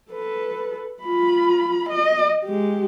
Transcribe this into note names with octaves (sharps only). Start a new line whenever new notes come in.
A4 B4
F4 B5
D#5
G#3 G4